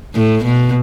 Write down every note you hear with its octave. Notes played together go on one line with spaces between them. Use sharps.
A2
B2